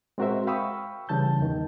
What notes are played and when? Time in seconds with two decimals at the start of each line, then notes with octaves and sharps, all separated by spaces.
0.18 G#3 C4 F#4 A#4 C5 E5
0.47 F5 G5 B5 C#6 D#6 E6
1.09 C#3 E3 G3 A5 G6
1.39 E2 D#3